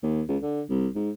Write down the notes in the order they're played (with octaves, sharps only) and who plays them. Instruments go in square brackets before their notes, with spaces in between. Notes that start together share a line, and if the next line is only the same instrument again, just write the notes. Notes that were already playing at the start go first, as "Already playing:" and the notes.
[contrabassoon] D#2
C#2
D3
C2
G#2